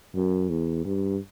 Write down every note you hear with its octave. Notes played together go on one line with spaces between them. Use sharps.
F#2
E2
G2